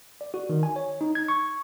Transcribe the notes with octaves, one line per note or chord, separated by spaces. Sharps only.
D5
F#4
D#3
G#5
C#5
D#4
G#6
C#6